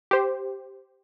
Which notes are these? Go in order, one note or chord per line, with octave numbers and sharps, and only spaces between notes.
G4 C5